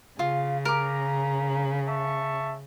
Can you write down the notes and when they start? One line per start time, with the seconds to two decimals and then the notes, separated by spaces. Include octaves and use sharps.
0.19 C#3 F4
0.65 A#4 A#5 D6
1.88 E5 A5 C#6